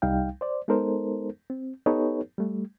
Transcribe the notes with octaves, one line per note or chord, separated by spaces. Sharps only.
C2 G3 D#4 F5 G5
C5 D5
G#3 B3 D#4 A4 A#4 C5
C4
B3 D#4 G4 A4 B4 C#5
G3 A3